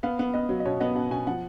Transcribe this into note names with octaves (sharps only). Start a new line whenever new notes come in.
B3 F5
B3
B3 D#5
F#3
D#5
B2 C#5
B3 D#5
B2 F#5
B2 G#5
F3 F#5